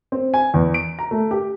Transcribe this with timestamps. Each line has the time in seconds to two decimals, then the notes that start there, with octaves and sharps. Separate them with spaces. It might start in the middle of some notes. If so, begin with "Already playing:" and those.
0.12 C4
0.34 G#5
0.54 E2
0.74 D7
0.99 A#5
1.11 A3
1.31 G4